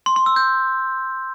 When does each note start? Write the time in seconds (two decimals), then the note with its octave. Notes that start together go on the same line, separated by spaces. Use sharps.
0.06 C6
0.16 C6
0.26 E6
0.36 G6